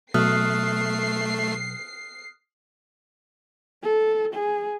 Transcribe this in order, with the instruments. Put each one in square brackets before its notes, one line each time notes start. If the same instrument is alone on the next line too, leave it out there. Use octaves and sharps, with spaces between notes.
[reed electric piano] B2 F#3 [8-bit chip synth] A3 [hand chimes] D#6 F6 F#6 [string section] C7
[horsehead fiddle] A4
G#4